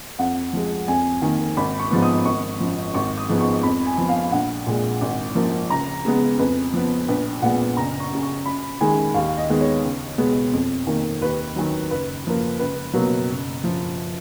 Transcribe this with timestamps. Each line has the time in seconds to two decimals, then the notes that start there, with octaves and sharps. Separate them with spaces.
0.19 F2 F#5
0.53 F3 G#3
0.88 F2 G#5
1.22 D#3 A#3
1.57 G#1 B5
1.80 C#6
1.91 G#2 F3 B3
2.02 D#6
2.25 G#1 C#6
2.60 F#2 F3
2.94 G#1 C#6
3.17 D#6
3.29 G#2 F3 G#3 B3
3.40 C#6
3.63 F2 B5
3.86 G#5
3.98 F3 B3
4.09 F5
4.32 A#1 F#5
4.67 A#2 G#3
5.01 G#1
5.35 F#2 F3 A#3
5.70 C#2 A#5
6.05 C#3 G#3 B3
6.39 F2 B4
6.73 F3 B3
7.08 A#1 B4
7.42 A#2 G#3 B3 F#5
7.76 F#1 A#5
8.00 C#6
8.11 F#2 C#3
8.23 C#6
8.46 F#2 B5
8.81 D#3 G#3 G#5
9.14 D#2 F5
9.37 D#5
9.49 D#3 G#3 B3
9.61 C#5
9.84 C#2
10.18 B2 G#3 B3
10.53 F2
10.87 D#3 A#3
11.21 D#2 B4
11.56 D#3 F#3
11.91 F#1 B4
12.25 F#2 F3 A#3
12.59 C#2 B4
12.94 B2 F#3 A#3
13.29 F#1
13.63 F#2 F3